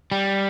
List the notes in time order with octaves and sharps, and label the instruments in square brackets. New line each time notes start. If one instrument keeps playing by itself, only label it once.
[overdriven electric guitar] G3